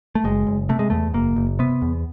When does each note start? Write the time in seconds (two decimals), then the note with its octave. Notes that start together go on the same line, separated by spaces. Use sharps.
0.15 A3
0.24 F#1 G#3
0.47 F#1
0.69 C3 A3
0.79 G#3
0.90 E2 A3
1.14 F#1 A#3
1.36 F#1
1.59 C3 B3
1.82 E2